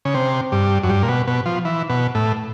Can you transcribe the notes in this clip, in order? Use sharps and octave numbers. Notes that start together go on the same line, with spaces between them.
C#3
C3
G2
F#2
G2
A#2
B2
B2
F3
E3
B2
A2